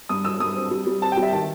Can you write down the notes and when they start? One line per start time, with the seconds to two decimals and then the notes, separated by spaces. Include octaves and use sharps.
0.09 G2 D#6
0.25 F#3 E6
0.40 G2 D#6
0.56 C4
0.71 G3
0.87 G3
1.02 C4 A5
1.12 G5
1.17 G3
1.22 E5
1.32 D#3 A5